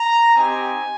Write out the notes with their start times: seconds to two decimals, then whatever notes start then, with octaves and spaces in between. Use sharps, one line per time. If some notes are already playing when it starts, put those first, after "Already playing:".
Already playing: A#5
0.35 C4 D#4 G4 G#5